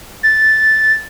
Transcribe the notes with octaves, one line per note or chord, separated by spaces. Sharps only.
A6